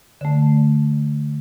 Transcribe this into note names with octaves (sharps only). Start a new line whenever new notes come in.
D3 A3